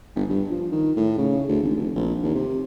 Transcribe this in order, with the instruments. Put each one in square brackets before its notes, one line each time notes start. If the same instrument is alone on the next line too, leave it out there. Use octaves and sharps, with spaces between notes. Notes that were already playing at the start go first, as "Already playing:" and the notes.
[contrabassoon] G1
G2
F3
D#3
A2
C#3
D2
G#1
F1
A#1
D#2
C3